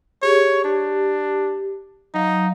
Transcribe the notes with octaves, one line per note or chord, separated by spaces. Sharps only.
G4 G#4 C#5
D4 G4
F#3 D#4 F5